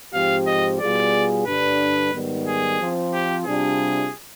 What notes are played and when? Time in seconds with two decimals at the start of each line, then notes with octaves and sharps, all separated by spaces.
0.14 G#2 F3 C4 G4 F5
0.47 D#5
0.80 B2 G3 B3 F4 G#4 D5
1.47 G2 D3 G3 D4 B4
2.13 G#2 D#3 G3 B3
2.47 G#4
2.80 F3 C4 F4
3.13 G4
3.45 C3 G3 D4 F4 G#4